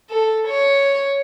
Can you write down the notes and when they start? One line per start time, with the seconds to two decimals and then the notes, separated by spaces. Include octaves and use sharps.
0.10 A4
0.47 C#5